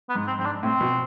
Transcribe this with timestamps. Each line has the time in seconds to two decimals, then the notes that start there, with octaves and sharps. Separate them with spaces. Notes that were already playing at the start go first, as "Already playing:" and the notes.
0.09 B3
0.15 G#2
0.27 C4
0.39 G#2 C4
0.45 D4
0.63 A2 C4
0.81 B2